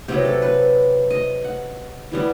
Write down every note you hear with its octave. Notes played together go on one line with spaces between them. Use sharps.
C3 F#3 B3 G4
A4
B4
D#5
F#5
E3 G3 B3